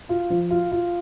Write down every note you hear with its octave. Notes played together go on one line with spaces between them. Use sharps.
F4
F3
F4
F4